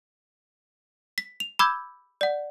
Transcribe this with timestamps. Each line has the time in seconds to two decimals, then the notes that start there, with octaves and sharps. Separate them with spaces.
1.18 B6
1.40 F7
1.59 B5 D6 E6 G6 G#6
2.21 D5 F#5